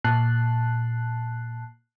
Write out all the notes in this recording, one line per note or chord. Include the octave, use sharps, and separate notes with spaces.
A#2 A5 F#6 C7